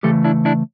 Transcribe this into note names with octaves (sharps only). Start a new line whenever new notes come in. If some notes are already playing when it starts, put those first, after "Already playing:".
C#3 E3 A3 G4 A4
D4 E4
D4 E4